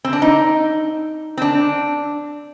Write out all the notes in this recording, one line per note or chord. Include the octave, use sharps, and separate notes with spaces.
C4
D4
D#4
C4
D4